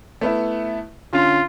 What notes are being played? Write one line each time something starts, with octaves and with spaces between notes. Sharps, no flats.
A3 B3 E4
D3 C#4 F4